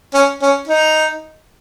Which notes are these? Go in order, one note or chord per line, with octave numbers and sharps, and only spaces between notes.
C#4
C#4
D#4